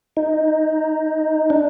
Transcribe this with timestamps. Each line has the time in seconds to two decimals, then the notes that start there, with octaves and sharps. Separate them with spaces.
0.17 D#4
1.50 D4